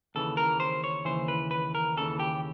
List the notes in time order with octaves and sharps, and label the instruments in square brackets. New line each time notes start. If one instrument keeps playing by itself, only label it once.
[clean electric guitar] D#2 C#3 E3 A4
A#4
C5
C#5
D#2 C#3 E3 C5
B4
B4
A#4
D#2 C#3 E3 A4
G4